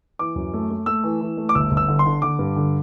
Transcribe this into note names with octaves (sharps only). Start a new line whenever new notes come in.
E3 D6
F#2
A3
A3
A3 E6
E3
E3
A3
D6
G1 E6
G1
E6
D3
C6
D3
D3 D6
G2
D3